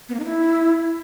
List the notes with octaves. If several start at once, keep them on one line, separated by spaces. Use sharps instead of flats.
B3
A#3
D#4
E4